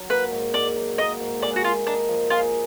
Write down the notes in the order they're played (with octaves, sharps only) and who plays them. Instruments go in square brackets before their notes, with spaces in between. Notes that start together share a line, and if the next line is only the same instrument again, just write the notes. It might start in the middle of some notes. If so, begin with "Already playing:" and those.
Already playing: [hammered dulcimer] F#3
[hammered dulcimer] A#3 [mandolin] B4
[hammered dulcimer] G#2
[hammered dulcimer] G#2 [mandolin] D5
[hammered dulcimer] F#3
[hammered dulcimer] A#3 [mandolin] D#5
[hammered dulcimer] G#2
[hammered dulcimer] G#4 [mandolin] D5
[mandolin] F#4
[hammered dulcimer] A#3 [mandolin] F4
[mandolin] D4 [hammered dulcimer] D#4
[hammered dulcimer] F3
[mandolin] F4 [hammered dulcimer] G#4